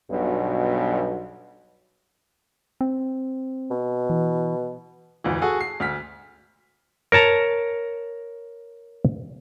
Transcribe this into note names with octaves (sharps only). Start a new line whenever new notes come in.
B1 G2 B2
C4
B2
E3
F1 D2 E3
F#4 G#4 A4
C7
D2 F6 B6
A#4 C#5 A5 A#5